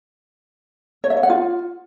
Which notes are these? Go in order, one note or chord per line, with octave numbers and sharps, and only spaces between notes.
C#5
E5
C#5
F#5
F4